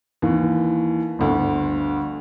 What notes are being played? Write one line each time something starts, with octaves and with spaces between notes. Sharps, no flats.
D#2 E3
G1 D2